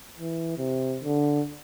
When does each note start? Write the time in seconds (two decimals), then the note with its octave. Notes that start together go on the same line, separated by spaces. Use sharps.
0.19 E3
0.57 C3
1.04 D3